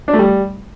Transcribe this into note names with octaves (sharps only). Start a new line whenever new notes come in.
D4
A3
G3